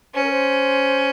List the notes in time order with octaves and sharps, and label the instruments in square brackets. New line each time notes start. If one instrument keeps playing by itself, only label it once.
[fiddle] C#4 [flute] C5
[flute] A#4
C5